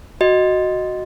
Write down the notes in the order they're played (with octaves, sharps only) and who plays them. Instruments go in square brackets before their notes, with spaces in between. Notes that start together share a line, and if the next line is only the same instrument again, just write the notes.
[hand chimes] F#4 D#5